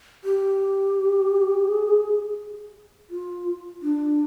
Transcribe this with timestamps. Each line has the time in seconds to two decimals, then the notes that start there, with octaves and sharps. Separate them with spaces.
0.24 G4
1.68 G#4
3.10 F4
3.83 D4